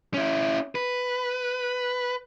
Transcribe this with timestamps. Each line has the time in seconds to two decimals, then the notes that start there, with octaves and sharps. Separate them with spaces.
0.14 C#4 E4
0.75 B4